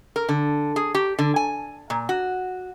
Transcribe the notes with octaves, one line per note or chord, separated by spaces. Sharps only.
A#4
D3
G#4
G4
D3
G#5
A#2
F#4